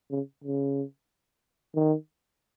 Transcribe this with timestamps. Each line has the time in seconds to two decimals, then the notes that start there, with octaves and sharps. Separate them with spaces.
0.11 C#3
0.44 C#3
1.75 D#3